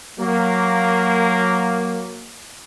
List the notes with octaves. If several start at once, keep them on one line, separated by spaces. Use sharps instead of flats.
F#3 A#3